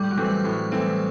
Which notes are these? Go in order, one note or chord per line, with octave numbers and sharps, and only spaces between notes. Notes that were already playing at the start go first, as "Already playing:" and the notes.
Already playing: A2 G3
F#3
E3 G3 A3 C4
A2
E3 A3 C4